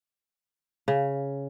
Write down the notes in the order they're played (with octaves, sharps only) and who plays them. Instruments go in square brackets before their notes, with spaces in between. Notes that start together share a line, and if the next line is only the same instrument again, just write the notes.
[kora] C#3